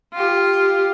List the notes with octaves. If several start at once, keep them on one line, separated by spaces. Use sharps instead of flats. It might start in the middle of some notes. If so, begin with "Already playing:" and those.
F4 G4